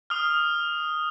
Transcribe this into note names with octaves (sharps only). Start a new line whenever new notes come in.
D#6 F6